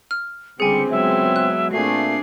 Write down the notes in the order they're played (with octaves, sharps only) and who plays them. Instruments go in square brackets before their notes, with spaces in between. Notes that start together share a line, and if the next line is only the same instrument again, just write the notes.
[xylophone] F6
[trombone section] C#2 C4 [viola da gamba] D3 G3 [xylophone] G#4 G#5 [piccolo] C#7
[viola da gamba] F#3 G#3 B3 [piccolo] E5
[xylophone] F#6
[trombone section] A#2 A3 [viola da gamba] C4 D4 G#4 [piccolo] C7